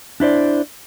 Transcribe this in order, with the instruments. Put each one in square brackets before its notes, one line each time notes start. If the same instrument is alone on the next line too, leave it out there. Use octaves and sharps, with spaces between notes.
[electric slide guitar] D4 E4 C5 D5